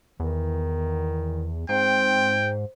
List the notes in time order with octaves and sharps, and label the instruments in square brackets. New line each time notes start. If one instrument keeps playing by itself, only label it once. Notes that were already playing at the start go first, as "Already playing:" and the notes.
[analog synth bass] E2 [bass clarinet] D#3
[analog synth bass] G#2 [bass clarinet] C4 [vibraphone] C5 [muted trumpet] G5